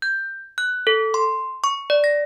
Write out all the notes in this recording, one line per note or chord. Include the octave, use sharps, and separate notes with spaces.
G6
F#6
A4
C6
C#6
D5
A#6